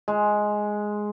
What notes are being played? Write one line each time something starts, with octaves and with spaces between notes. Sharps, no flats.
G#3